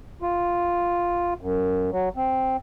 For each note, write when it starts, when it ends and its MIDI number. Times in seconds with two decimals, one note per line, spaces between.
0.22 1.34 65
1.41 1.91 42
1.92 2.09 54
2.17 2.57 60